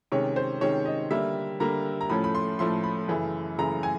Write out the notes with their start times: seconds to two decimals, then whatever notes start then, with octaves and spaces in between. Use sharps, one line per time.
0.12 C3 D#3 G#3 C#4 C#5
0.36 C5
0.61 C3 D#3 G#3 C#4 C#5
0.85 D#5
1.11 D3 G3 A#3 E5
1.60 D3 G3 A#3 A#5
2.01 A#5
2.10 A2 F3 A3 C#4 B5
2.24 B5
2.35 C6
2.59 A2 F3 A3 C#4 C6
2.84 B5
3.08 F#2 C#3 E3 A3
3.58 F#2 C#3 E3 A3 A#5
3.83 G#5